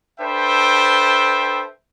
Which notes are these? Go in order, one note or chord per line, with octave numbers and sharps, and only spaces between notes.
D4 A4 B4 C5 E5 G5